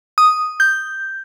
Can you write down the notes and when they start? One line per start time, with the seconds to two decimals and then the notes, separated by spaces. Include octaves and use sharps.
0.18 D#6
0.60 G6